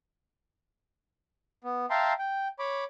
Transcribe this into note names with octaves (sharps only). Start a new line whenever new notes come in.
B3
E5 F5 G5 A5 A#5 C6
G5
C#5 B5 D6